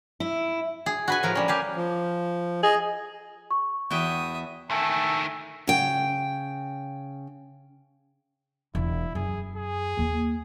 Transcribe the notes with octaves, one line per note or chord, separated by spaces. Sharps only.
E4
G#4
F#4 B4 G#5
A2 F3 A#4
G3 C#4
G4 F5 G#5
F3
G#4 D#5
C#6
E2 F#4 E5 G5 D#6
D#3 A3 E5 G#5 A5
C#3 G5
E1 E4 F4
F#2 G#4
G#4
D#2 A#3